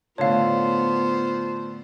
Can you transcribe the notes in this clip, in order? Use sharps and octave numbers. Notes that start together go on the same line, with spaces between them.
A2 D3 B3 F4 C5 C#5 F5 A5